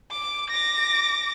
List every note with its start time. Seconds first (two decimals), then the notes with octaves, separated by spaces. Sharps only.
0.12 D6
0.50 D6 A#6